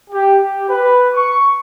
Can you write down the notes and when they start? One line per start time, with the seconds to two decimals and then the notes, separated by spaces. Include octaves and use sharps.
0.10 G4
0.40 G4
0.69 B4
1.14 C#6